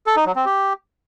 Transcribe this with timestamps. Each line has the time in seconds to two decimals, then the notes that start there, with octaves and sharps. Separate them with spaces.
0.07 A4
0.16 D#4
0.26 F#3
0.36 C4
0.45 G4